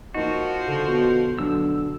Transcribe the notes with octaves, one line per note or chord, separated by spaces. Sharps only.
F3 A#3 D#4 F#4
D3
B2
B1 D3 E6